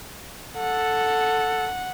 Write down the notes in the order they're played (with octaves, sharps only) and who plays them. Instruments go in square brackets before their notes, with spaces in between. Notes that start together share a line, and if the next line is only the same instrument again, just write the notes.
[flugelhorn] A4 [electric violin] F#5